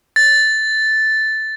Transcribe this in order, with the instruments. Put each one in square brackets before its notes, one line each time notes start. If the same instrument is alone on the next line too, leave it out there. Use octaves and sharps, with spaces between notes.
[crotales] A6